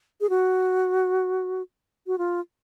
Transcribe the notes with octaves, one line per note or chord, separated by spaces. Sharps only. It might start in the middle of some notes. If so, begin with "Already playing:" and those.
G#4
F#4
F#4
F4